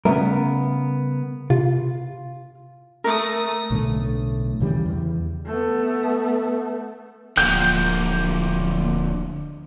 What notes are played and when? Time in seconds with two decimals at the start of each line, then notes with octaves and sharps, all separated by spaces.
0.05 C#3 G3 A3 B3 A#4
1.50 C3 F4
3.04 A3 A#4 D#6
3.71 B1 A2 D3 A3
4.60 D#2 C#3 E3 G3
4.86 E2
5.47 A3 B3
7.37 D1 D3 F3 A#3 G5 G6